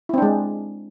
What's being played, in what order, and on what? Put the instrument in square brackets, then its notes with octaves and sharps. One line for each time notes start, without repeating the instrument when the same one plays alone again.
[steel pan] E4
C4
D4
G#3